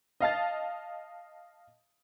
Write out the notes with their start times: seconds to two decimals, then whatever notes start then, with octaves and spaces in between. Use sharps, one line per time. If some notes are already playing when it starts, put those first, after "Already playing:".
0.20 D#5 F5 A5 A6